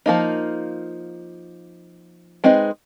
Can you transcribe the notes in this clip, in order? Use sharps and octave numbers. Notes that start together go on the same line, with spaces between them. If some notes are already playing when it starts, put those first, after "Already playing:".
F3 A#3 D#4
G#3 C4 D#4 B4 D#5